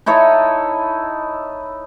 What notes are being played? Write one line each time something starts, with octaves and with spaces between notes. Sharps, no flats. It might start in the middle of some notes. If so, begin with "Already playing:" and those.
D#4 E4 A4 C#5